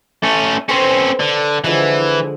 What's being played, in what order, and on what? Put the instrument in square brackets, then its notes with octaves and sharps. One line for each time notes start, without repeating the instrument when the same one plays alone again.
[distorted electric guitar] A3 C#4
[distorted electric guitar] C4 C#4 [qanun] A4 B4 C5
[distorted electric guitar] D3
[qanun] D3 F3 G#3 [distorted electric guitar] E3